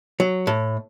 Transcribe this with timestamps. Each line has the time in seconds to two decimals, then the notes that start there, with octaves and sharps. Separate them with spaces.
0.20 F#3
0.47 A2